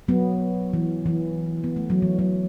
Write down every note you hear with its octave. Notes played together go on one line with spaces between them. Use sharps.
F#3 B3
E3
E3
B3
A3
F#3
E3
F#3